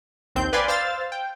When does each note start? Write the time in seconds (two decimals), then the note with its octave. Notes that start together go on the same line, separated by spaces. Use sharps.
0.35 A#1 D#2 C4 G6
0.53 B4 D5 F5 G5 G#5 C6
0.68 C5 F5 E6 F6 A6
1.12 G5